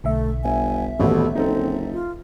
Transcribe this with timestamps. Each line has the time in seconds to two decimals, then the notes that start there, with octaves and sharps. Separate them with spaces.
0.04 B1 D3 A3 E5
0.44 G1 G#5
0.99 D#1 A1 B2 A4
1.35 F#1 C4 D#4 A4
1.93 F4